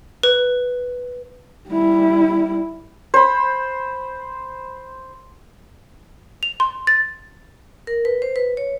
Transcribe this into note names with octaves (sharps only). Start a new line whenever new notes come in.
B4
G3 E4
C5 B5
F7
C6
A6
A#4
B4
C5
B4
C#5